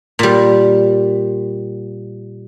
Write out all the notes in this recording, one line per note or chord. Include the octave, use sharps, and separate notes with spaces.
A#2 G3